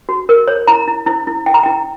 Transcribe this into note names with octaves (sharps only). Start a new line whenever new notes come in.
F#4
A#4
C#5
E4 A#5
E4
E4
E4
E4 G5
A#5
E4 G5